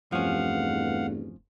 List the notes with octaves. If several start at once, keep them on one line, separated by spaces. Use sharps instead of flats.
F1 E2 G2 F3 C#4 F5 F#5